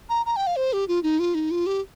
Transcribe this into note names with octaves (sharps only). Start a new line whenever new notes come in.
A#5
A#5
G5
F5
C5
G4
F4
D#4
F4
D#4
F4
G4